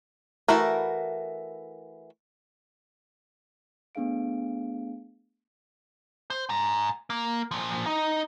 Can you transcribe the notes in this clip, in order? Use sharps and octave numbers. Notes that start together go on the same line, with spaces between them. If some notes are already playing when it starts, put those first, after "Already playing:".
E3 A3 E4 F#4 A#4
A3 B3 D4 G#4 F5 D7
C5
G#5 A#5
A#3
A#2 F3
D#4